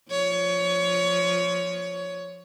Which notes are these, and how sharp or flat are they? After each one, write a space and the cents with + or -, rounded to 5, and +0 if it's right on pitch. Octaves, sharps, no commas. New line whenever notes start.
F3 +0 C#5 +20